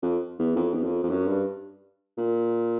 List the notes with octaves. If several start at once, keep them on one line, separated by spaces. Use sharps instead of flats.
F2
E2
F2
E2
F2
F2
F#2
G2
A#2